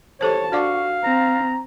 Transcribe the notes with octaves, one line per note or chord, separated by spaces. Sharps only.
G4 A4 C5 C#5 A5
D4 F#4 D5 F5 C#6 D6
C4 A#5